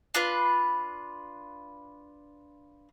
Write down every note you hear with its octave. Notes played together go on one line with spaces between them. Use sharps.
D4 F4 B4 B5